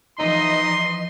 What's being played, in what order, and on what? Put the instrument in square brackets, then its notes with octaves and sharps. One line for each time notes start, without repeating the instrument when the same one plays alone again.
[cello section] E3 F3 D#5 [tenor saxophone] D#4 [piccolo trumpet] C6